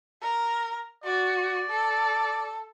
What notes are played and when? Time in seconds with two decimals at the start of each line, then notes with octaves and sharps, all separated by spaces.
0.22 A#4
1.04 F#4 D5
1.70 A4